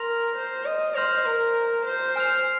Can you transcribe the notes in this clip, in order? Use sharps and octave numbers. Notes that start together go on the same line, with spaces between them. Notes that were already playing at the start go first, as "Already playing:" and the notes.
Already playing: A#4 C6 F6 A#6 F7
C5
D#5
C5 C6 F6 A#6 F7
A#4
C5
G#5 F6 C7 F7